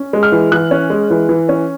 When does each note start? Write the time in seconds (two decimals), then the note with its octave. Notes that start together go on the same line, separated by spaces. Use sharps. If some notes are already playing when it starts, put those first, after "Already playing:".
Already playing: C#4
0.13 G#3
0.23 F6
0.32 E3
0.52 E3 F#6
0.71 C#4
0.90 G#3
1.10 E3
1.29 E3
1.49 C#4